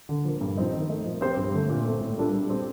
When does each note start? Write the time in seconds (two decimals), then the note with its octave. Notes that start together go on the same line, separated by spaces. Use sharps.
0.09 D3
0.25 F3 A#3
0.41 G2
0.57 F3 C4 D#4
0.74 D#3
0.89 A3 D#4 A#4
1.06 F3
1.21 C4 G4 C5
1.37 G2
1.53 D3 A3
1.70 A#2
1.86 A3 C4
2.01 A2
2.17 G3 D4 F4 A4
2.33 G3
2.50 C4 G4